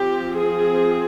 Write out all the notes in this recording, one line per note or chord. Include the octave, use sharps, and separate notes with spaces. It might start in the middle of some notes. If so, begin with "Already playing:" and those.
Already playing: F3 C4 G4
G#4